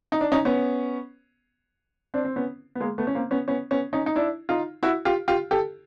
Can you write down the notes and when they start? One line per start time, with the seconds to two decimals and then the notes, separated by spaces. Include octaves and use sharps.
0.12 D#4
0.21 D4
0.32 C#4 D#4
0.45 B3 C#4
2.14 C4 D4
2.25 C4
2.36 B3 C#4
2.75 B3
2.80 G#3 A#3
2.98 A3 B3
3.07 C#4
3.14 A#3 C4
3.31 B3 C#4
3.48 B3 C#4
3.71 B3 C#4
3.93 C#4 D#4
4.06 D#4
4.16 D4 E4
4.49 D#4 F4
4.83 E4 F#4
5.05 F4 G4
5.28 F4 G4
5.51 G4 A4